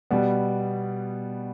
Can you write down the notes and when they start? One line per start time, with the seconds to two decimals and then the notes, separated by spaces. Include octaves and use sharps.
0.11 B2 G3 B3